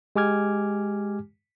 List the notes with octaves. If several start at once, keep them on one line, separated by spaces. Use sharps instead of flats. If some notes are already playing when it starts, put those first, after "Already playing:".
G#3 G4 G#5 D6 F6 G#6